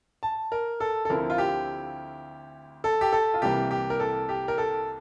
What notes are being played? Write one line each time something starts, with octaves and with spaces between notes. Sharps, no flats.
A5
A#4
A4
A4
D2 D3 F3 C4 E4 A#4
F4
G4
A4
G4
A4
F4
C2 C3 E3 G3 A#3 G4
G4
A#4
A4
G4
A#4
A4